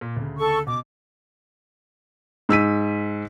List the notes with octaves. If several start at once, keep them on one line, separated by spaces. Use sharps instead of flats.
A#2
D2 C#3
A4 C#6
B2 D6
G#2 E6 B6 D#7